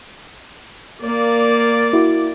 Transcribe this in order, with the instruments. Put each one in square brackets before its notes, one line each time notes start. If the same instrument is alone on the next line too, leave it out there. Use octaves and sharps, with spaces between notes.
[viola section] A#3 D5
[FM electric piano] E4 F#4 D6